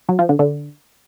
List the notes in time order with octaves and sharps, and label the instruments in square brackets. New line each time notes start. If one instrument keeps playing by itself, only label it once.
[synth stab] F#3
F3
D3
D3